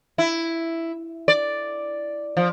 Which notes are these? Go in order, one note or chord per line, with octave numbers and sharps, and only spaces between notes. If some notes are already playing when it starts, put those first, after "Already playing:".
E4
D5
F3